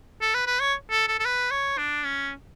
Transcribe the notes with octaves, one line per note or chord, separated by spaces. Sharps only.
A4
B4
B4
C#5
A4
A4
A4
B4
C#5
D4
C#4